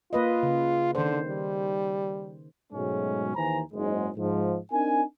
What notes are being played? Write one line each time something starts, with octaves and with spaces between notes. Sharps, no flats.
A#3 F4 B4 D#5
C#3
D3 D#3 C5
G3
G#2 B2 F#3 G#3 A3 C#4
D#2 D#3 E3 C5 G#5 A#5
F#1 G#2 G#3
G#2 F3
C4 D4 D#4 A#4 G#5